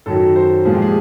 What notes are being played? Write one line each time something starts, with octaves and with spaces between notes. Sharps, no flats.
F#2 D#3 F#3 A4
C5
A#2 F3 G#3 G#4
G4
G#4